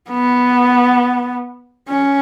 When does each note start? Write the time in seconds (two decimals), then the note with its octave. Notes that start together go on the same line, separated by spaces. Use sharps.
0.10 B3
1.89 C#4